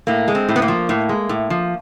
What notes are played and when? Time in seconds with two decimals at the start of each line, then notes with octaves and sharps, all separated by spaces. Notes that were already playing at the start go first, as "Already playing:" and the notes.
0.07 A2 A#3
0.28 G#3
0.35 C4
0.49 A2
0.56 B3
0.62 A#3
0.68 F3
0.89 A2
1.09 G#3
1.29 A2
1.50 F3